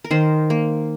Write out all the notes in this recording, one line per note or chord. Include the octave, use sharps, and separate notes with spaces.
A#4
D#3 C5
A#3